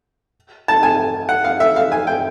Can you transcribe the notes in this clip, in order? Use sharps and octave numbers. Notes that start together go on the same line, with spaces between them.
A5
G#5
F#5
F5
E5
F5
G#5
G5